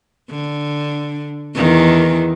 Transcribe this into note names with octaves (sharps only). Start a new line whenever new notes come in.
D3
E2 D#3